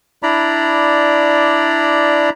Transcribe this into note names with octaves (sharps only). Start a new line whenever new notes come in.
D4 E4 D5 A#5 B5